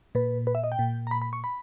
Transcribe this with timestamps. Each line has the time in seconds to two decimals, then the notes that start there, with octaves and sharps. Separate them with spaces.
0.15 A#2 B4
0.47 B4
0.55 E5
0.64 D#5
0.72 G5
0.79 A#2
1.07 A#5
1.11 B5
1.22 B5
1.33 C#6
1.44 B5